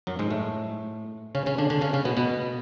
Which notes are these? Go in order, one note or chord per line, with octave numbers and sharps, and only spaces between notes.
F#2 F#3
G#2 G#3
A2 A3
C#3 C#4
C#3 C#4
D3 D4
D3 D4
C#3 C#4
C#3 C#4
B2 B3
B2 B3